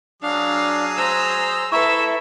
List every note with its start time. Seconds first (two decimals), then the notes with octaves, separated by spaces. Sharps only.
0.23 F#3 D4 G#4 F5 D#6
0.97 C5 A#5 E6
1.72 E4 A4 B4 E5 A#5 C#6